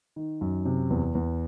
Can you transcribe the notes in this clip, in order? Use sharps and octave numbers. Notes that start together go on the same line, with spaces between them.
D#3
F#2
C3
E2
E2